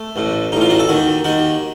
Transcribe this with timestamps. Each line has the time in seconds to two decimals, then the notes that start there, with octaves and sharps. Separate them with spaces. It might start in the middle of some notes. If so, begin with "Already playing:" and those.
Already playing: A3
0.16 A1 A2
0.52 A1 A2 D#4
0.61 F4
0.70 F#4
0.79 A4
0.88 D#2 D#3 F#4
1.24 D#2 D#3 F#4